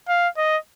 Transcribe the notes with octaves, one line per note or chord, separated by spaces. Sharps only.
F5
D#5